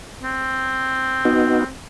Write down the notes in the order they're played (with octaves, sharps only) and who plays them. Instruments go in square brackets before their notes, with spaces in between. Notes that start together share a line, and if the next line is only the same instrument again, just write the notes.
[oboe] C4
[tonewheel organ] B3 D#4 F#4